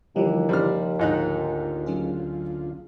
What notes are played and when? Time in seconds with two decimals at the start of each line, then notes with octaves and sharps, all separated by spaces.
0.16 D#2 D3 E3 F3 G3
0.49 C#3 F3 G3 C5 F6
0.99 D2 G#2 D#4 F4 F#6
1.86 F#3 C#4 G#4